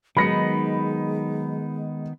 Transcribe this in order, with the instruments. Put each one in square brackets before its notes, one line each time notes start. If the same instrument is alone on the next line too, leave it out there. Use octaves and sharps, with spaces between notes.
[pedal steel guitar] D#3 B3 D#4 [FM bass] F#3 [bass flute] G#3 [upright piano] B5 A#6 C#7